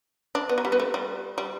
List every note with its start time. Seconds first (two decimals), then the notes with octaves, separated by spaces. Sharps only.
0.35 D4
0.49 B3
0.58 F#3
0.65 G3
0.72 B3
0.80 A3
0.94 G3
1.38 G3